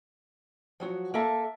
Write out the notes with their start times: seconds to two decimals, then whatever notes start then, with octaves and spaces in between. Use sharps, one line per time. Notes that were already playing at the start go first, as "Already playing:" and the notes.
0.80 F3 F#3 F#4
1.14 A#3 A4 E5 A5